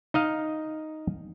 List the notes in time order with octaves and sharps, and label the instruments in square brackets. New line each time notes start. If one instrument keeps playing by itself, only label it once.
[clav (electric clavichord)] D#4 D#5 F5